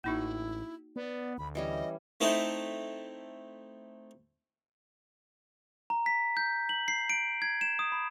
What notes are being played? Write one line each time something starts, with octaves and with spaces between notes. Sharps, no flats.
A1 A#3 D#4 E4 F#4
B3 D5
D2 B5
E3 G3 C#4 D#5
A3 C4 D#4 E4 A4
A#5
B6
G6
F#7
C7
D7
G#6
E7
D#6
B5